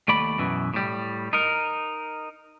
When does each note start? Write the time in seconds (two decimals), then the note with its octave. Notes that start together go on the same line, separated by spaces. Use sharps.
0.08 D#2 A3 D5 B5
0.38 F#2 B2 E3
0.74 A2 G3
1.33 D#4 A#4